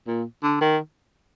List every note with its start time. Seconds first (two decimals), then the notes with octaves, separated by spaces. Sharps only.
0.07 A#2
0.43 D3
0.61 D#3